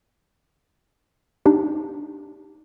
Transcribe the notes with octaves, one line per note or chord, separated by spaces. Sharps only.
D4 D#4 G4